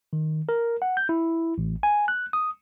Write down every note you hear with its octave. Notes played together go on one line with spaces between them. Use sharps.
D#3
A#4
F#5
G6
E4
A1
G#5
F#6
D#6